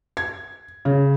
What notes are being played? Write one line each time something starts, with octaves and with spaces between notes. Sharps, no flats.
G#6
C#3